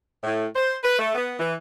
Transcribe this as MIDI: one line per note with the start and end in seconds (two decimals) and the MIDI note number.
0.24 0.46 45
0.56 0.76 72
0.84 0.99 71
0.99 1.15 57
1.15 1.35 59
1.40 1.54 52